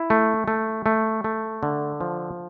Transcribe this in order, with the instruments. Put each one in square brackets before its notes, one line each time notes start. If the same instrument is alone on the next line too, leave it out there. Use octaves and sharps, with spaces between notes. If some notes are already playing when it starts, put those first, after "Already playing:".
Already playing: [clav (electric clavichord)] E4
A3
A3
A3
A3
D3
F3